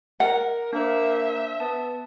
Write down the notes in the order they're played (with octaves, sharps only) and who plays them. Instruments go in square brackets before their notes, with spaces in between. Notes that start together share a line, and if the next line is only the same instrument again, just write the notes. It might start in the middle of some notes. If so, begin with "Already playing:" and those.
[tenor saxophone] A#4 [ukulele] F#5
[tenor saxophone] A#3 [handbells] D4 C5 [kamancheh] E5
[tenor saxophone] B3 [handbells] A5